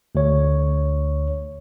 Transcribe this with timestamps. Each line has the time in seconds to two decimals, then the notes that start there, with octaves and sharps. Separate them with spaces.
0.15 D2 C#5